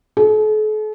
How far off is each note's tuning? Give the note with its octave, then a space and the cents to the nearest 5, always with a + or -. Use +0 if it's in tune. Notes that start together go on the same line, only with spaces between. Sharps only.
A4 -45